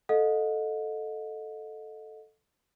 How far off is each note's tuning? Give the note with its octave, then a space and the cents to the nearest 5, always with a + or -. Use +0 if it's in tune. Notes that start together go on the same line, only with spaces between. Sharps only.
A4 +0 D#5 +0 F#5 -45